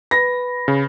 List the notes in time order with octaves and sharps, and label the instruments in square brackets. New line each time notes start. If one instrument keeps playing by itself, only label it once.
[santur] B4 [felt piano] A#6
[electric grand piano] C#3